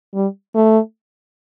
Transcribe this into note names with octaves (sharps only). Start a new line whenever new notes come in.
G3
A3